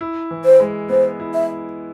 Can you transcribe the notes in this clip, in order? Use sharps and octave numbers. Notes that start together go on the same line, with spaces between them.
E4
E3
C5
G#3
B3 C5
E4
E5